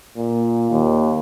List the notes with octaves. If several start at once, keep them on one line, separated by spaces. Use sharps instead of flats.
A#2
D#2